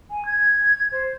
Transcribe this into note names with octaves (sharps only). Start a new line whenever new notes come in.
G#5
G#6
C5